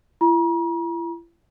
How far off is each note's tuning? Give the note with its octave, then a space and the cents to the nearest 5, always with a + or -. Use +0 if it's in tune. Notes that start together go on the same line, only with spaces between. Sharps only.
E4 +40 A#5 +40